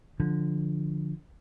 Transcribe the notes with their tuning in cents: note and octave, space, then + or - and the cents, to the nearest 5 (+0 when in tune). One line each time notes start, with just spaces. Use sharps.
D3 +0 F3 +0